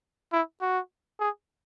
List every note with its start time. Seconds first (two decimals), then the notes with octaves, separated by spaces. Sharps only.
0.32 E4
0.61 F#4
1.20 G#4